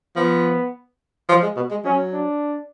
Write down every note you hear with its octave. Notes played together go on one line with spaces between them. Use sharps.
F3 B3
F3
G#3
B2
G#3
F#3 C#4
D4